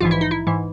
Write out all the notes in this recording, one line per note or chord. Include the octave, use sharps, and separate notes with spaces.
A#1 G#2 E3 F4
E4
D#4
E4
G#2 E3